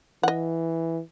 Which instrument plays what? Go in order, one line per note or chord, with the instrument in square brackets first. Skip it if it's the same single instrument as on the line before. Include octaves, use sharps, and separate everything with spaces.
[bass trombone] E3 [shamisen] D#5 F#5